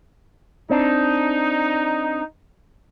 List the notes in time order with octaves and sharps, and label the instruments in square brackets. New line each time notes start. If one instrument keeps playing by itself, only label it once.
[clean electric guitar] C4 D4 [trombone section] D#4